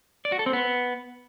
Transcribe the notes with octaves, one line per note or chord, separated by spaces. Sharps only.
D5
F#4
A4
C4
B3